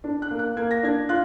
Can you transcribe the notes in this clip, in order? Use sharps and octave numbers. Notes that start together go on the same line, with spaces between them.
D4
F#6
A#3
F#6
A#3 G#6
A#6
D4 G#6
F4 F#6